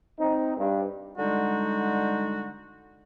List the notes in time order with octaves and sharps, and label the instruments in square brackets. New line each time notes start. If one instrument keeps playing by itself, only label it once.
[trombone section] C4 D#4
G2
[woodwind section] D3 G3 G#3 D#4 F#4